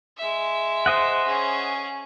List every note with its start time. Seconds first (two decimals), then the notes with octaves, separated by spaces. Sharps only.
0.18 G#3 E5
0.86 C5 D#5 F#5
1.26 C#4 G#4